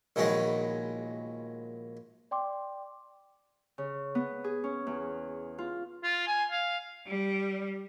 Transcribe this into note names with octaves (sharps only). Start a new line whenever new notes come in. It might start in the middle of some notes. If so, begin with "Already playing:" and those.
A#1 D#3 F#3 G#3 B3 D#4
D5 G5 C6 D6
C#3
B3
G#4
C#4
E2
F4
F4
G#5
F5
G3